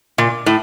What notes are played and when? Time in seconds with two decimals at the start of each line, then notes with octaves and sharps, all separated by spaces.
0.18 A#2
0.46 A2